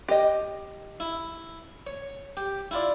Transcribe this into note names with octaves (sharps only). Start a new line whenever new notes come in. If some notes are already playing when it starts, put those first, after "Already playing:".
G4 D#5
E4
C#5
G4
E4 F4 D5